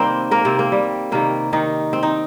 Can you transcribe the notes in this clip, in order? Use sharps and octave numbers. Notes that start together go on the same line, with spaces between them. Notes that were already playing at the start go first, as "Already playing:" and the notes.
Already playing: C3 D#3 G3 A#3 C4 G4 A#4 C5
A#3 A#4
C3 C4
A#3
G3
C3 D#3 G3 A#3
D#3 D#4
C4
D#4